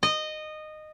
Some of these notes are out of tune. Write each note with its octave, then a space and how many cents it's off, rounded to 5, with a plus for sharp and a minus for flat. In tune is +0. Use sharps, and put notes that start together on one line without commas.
D#5 -15